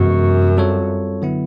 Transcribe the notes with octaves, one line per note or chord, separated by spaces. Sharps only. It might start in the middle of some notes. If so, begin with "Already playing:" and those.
Already playing: F#2 C3 E3 G#3 B3
G3 C4 F4 A4 C#5
D3 F#3 B3 E4